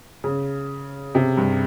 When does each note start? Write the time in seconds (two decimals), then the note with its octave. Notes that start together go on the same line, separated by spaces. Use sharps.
0.24 C#3
1.15 C3
1.37 G2